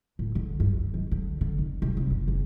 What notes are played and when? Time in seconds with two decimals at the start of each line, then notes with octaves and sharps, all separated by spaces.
0.19 A2
0.35 D3
0.60 G2
0.73 F#3
0.94 D#3
1.11 D3
1.41 D3
1.58 D#4
1.82 B1
1.97 C2
2.10 F#1
2.28 E2